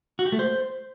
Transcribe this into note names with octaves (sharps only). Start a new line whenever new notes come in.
F#4
G4
A3
C5